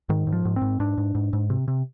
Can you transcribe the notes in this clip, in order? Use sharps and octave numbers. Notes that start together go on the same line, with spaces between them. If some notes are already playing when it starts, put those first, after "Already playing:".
G#2 D#3
G#2
F3
G#2
C4
G#2
G#2 D4
G#2
G#2
G#2
C3
C3